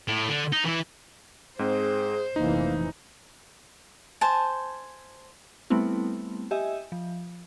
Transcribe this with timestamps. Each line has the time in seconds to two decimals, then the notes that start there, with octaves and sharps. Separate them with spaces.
0.08 A2
0.29 D3
0.53 D#4
0.65 E3 E4
1.59 G#2 C4 G#4 C5
2.36 F1 A#1 E3 A#3 D#4
4.21 C5 G#5 A5
5.70 G3 A3 B3 C4 E4
6.51 G4 D#5 E5 G#5
6.92 F3